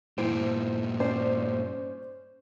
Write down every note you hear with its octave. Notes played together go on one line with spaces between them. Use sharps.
G2 A#2 E3 C5 D7
C#4 C5 D5